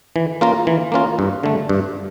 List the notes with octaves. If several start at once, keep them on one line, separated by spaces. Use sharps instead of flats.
E3
A#3 C#4 F4 A#4
E3
A#3 C#4 F4 A#4
G2
D3 A3
G2